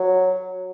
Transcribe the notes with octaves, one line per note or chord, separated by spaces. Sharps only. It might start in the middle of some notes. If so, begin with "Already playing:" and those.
Already playing: F#3